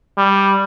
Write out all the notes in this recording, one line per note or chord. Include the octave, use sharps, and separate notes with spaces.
G3